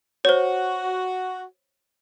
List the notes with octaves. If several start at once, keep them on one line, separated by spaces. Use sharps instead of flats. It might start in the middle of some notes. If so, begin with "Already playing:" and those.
F#4 C5 C#5